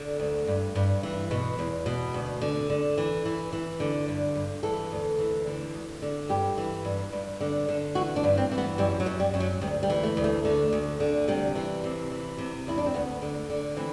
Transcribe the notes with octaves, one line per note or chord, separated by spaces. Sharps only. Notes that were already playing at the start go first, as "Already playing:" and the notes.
Already playing: D3
D2
G2
G2
E3
B2 B4
E2
B2
D2
D3
D3
E3
E3
E3
D3
G2
G2
E3 A4
D2
E3
D3
D2
D3
G2 G4
E3
G2
G2
D3
D3
E3 F#4
D4
G2
C4
E3
B3
F#2 G3
F#3
F#2
G3
F#2
F#3
D2 G3
G3
E3
A3
D2
A3
D3
D2
D3
C3 G3
E3
C3
E3
C3
E2 E4
D4
C4
D2 B3
D3
D3
E3 C4